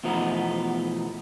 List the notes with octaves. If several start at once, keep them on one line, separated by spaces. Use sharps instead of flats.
E2 B2 F3 A3 B3 D#4